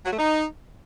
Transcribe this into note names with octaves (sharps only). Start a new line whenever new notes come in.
F#3
A3
D#4